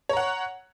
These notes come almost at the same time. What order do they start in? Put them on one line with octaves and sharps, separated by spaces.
C#5 A#5 F#5